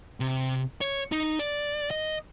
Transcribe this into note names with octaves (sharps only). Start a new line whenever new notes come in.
C3
C#5
D#4
D5
D#5